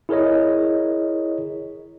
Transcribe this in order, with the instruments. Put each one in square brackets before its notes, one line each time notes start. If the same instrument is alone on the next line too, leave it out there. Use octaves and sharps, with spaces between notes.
[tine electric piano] E4 G#4 A#4 C#5 D#5